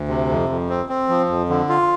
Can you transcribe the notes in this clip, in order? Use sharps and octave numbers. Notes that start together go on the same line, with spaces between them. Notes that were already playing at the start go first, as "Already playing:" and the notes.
Already playing: D2
C3
F2
F2
C4
C4
F3
F2
D3
F4